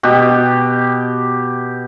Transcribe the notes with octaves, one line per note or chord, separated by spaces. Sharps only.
B2 G4